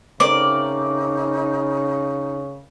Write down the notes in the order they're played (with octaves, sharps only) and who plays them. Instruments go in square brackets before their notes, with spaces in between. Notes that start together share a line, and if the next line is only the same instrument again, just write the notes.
[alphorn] C#3 [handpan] A3 C4 A#4 [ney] D#4 [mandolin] D5